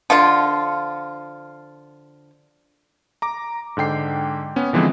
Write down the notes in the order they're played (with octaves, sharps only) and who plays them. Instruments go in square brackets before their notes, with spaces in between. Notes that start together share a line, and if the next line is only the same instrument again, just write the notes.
[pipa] D3 F3 F4
[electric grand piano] A#5 D6
G#2 D3 G5 C7
B3 C#4
D3 E3 F3 G#3 B3 C4